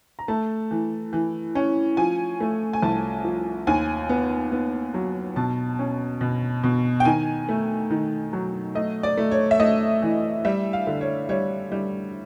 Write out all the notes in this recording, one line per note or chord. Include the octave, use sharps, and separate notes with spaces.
A#5
A3 A5
E3
E3
C#4
F3 G#5
A3
G#5
C2 A5
F3
D#2 G#5
B3
B3
F#3
B2 A5
C#4
B2
B2
G5
D#3 G#5
A3
D#3
F#3
A3 D#5
D5
A3
C#5
E5
A3 D#5
E3
G3 E5
F5
D3
C#5
G3 C#5
G3